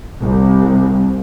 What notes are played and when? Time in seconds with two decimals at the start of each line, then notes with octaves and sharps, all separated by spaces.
0.20 C2